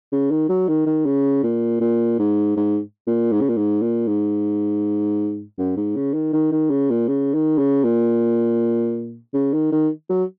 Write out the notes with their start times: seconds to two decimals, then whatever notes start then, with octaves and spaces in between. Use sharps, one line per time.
0.12 C#3
0.31 D#3
0.49 F#3
0.68 D#3
0.86 D#3
1.06 C#3
1.43 A#2
1.81 A#2
2.19 G#2
2.56 G#2
3.07 A#2
3.32 G#2
3.41 C#3
3.49 A#2
3.57 G#2
3.82 A#2
4.08 G#2
5.58 F#2
5.77 G#2
5.96 C#3
6.14 D#3
6.33 D#3
6.52 D#3
6.70 C#3
6.90 A#2
7.08 C#3
7.34 D#3
7.58 C#3
7.84 A#2
9.34 C#3
9.53 D#3
9.72 D#3
10.10 F#3